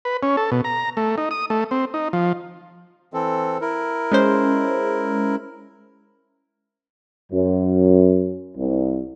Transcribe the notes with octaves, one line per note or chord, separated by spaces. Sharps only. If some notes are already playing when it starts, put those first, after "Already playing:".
B4
C#4
A4
B2
A#5
A3
D#4
D#6
A3
C4
D#4
F3
E3 C4 A4
E4 A#4
G#3 C#4 C5
F#2
C2